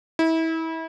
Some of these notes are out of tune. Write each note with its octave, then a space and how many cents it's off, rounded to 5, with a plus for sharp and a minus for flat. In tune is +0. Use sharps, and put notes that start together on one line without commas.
E4 -30